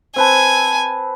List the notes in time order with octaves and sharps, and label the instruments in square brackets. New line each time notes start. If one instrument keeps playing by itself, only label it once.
[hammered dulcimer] C4 B4 A5 [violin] G#5